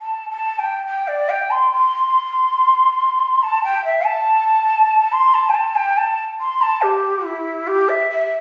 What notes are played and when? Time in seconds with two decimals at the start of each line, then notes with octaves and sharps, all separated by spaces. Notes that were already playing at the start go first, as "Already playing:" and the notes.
0.01 A5
0.30 A5
0.58 G5
0.86 G5
1.07 D5
1.29 G5
1.50 C6
1.72 C6
3.42 A5
3.63 G5
3.84 E5
4.05 A5
5.12 C6
5.34 A5
5.49 G5
5.54 A5
5.75 G5
5.97 A5
6.40 C6
6.61 A5
6.82 G4
7.25 E4
7.67 G4
7.89 E5
8.10 E5